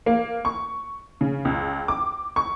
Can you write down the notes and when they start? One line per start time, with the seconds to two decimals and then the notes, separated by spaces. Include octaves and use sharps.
0.06 A#3
0.45 C#6
1.21 C#3
1.45 C#2
1.88 D6
2.36 C#6